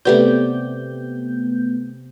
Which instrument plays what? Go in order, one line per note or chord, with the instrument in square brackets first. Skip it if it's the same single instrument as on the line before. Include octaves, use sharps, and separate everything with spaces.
[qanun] C3 G4 D5 [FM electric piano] A3 B3 G6